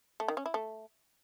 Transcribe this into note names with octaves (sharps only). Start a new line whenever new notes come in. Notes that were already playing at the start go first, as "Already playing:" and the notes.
A3
D#3
C#4
E4
A3